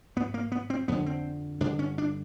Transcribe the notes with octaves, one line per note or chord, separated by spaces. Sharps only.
G#2 B3
A#3
B3
C4
F2 D3 B3
C4
G2 D3 D4
C#4
D4